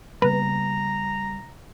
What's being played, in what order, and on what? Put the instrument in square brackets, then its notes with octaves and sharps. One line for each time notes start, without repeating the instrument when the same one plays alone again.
[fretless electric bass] C#3 A#3 B3 [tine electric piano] G3 [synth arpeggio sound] B4 [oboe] A#5